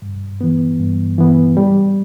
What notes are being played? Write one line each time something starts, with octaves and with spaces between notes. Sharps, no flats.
G2
E3 B3
G2
E3 B3
G3